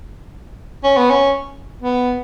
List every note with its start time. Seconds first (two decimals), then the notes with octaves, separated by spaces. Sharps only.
0.84 C#4
0.97 B3
1.10 C#4
1.82 B3